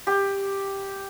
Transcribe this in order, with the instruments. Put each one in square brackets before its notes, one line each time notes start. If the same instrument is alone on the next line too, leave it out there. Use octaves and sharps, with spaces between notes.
[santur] G4